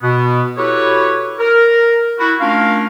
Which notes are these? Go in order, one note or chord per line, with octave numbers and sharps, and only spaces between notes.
B2 B3
E4 F#4 G4 A4 B4 C#5
A#4
E4 F#4
A3 C#4 D4 F4 A#4 F5